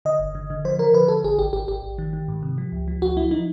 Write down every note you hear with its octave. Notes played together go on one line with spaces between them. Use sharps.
D3 D#5
G1
D3
D3
F3 C5
F3 A#4
D3 B4
D3 A4
G#1 G#4
G#1 G4
G#1 G4
G#1 G4
G#1
D#3
D#3
G#2
C3
F3
C#2
F3
C#2 F#4
F3 E4
F3 D#4